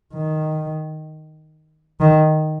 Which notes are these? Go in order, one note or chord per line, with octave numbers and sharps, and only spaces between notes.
D#3
D#3